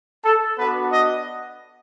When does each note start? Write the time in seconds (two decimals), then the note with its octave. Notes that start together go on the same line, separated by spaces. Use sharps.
0.24 A4
0.59 B3 D4 F#4 B4
0.93 D#5